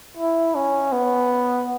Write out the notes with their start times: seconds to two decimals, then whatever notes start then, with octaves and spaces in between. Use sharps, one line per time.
0.17 E4
0.55 C#4
0.92 B3